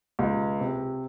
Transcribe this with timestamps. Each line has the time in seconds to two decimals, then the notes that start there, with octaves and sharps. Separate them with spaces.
0.19 C#2
0.60 C3